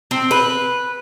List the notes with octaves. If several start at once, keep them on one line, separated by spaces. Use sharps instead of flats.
C4
B4